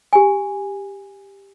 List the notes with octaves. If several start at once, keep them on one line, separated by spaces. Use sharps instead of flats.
G4 G#5